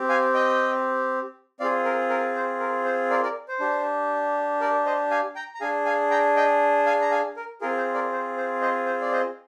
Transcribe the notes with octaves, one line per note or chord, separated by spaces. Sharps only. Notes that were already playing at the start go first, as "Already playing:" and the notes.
Already playing: C4 G4
F5 G#5
D#5 G5
C4 F4 G#4 D5 F5
A#4
A#4
C5
A#4
C5
A#4 D5
A#4 D5
C5
D4 G4
A#4 D5
C5 D#5
F5 G#5
G5 A#5
A#5
D4 G#4 F5 G#5
F5 G#5
G5 A#5
D#5 G5
F5 G#5
A#5
F5 G#5
A#4
C4 F4 G#4 A#4
C5
A#4 D5
C5
C5
C5 D#5
C5
D5
C5 D#5